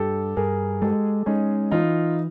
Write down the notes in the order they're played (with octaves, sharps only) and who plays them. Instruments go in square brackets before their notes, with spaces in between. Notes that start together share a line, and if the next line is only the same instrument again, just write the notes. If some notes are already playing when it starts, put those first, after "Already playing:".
Already playing: [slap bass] G2 [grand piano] G4 A4
[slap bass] G2 [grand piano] G#4 A#4
[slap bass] G#3 [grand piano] G4 A4
[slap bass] G#3 [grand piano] C#4 D#4
[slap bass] E3 [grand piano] D#4 F4